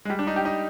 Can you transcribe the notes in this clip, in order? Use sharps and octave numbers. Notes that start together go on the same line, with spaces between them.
G#3
G3
D4
D#4
G4
D#4